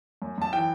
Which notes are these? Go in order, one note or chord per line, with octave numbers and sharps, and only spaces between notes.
F#2
F#2 A5
E3 G5